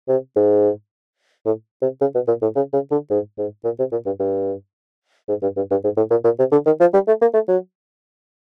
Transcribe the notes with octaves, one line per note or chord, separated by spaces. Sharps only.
C3
G#2
A2
C3
C#3
B2
A#2
A2
C#3
C#3
D3
G#2
G#2
A#2
C3
A#2
G2
G2
G#2
G2
G2
G2
G#2
A2
A#2
A#2
C3
D3
D#3
F3
G3
A3
A#3
A3
F#3